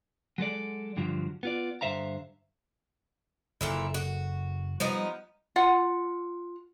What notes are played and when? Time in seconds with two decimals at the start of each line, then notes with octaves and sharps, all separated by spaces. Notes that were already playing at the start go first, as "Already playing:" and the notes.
0.38 F#3 G#3 A4 D5
0.97 G2 D3 F3 F#3
1.43 B3 F4 D5
1.81 G2 D3 C5 E5 F5 A#5
3.61 F#1 A#2 D3 E4
3.94 F#4
4.80 F3 G3 B3 D#4
5.56 F4 F#5